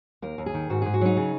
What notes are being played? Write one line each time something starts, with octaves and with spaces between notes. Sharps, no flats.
D#2 A#4
D#2
G#4
D#3
G#2 F#4
G#2 G#4
F#4
F#3 D#4
C#3